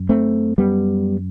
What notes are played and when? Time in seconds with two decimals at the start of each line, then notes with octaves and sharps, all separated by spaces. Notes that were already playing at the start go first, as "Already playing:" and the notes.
Already playing: F#2
0.09 A3 C4
0.58 F#2 G3 B3